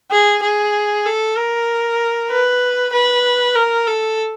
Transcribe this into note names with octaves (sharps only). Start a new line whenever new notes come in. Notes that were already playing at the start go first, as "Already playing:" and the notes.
G#4
G#4
A4
A#4
B4
B4
A#4
A4